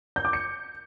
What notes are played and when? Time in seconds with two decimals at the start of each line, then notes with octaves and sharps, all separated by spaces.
0.16 G6
0.25 D6
0.33 C#7